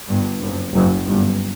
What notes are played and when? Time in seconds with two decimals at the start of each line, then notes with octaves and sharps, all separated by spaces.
0.09 G1 G2
0.41 F#1 F#2
0.74 F#1 F#2
1.07 G1 G2